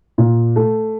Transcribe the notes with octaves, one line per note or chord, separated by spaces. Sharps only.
A#2
A3